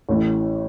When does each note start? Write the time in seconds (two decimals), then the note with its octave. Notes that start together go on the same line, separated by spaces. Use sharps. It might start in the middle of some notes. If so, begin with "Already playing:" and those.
0.09 A1 A2 E3